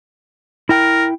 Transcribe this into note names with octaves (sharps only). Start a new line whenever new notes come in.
E4 A#4 G5